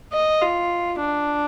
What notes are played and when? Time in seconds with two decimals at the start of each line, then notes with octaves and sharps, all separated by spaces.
0.13 D#5
0.42 F4
1.00 D4